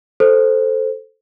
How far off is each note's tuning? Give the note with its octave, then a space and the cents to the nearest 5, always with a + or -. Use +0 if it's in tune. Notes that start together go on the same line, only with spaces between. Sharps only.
A4 +0 C5 +0